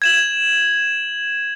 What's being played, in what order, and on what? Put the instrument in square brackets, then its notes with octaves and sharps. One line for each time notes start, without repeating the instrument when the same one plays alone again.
[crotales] G#6 E7 F#7